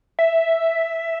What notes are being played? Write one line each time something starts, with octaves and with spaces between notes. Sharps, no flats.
E5